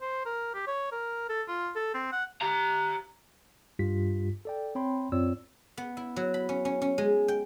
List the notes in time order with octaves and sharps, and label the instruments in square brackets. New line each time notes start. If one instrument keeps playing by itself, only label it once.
[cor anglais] C5
A#4
G4
C#5
A#4
A4
F4
A4
C4
F#5
[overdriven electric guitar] G4 A#5
[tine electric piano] G2 G3 F4 G4 B6
A4 D5 G5
C4 C#5 G5 B5 C6
F#2 C4 F4 C#5 D5 E6
[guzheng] B3
E4
F#3
B5
C#4
C#4
C#4
G#3
G5